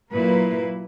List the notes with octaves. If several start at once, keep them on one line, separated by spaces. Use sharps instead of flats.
A#2 F#3 A#3 E4 B4